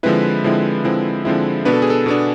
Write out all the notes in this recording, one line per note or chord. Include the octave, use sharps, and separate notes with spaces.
D3 F3 G#3 C4 E4 B4
D3 F3 G#3 C4 E4
D3 F3 G#3 C4 E4
D3 F3 G#3 C4 E4
B2 B3 D4 B4
A4
G#4
A4
B2 B3 D4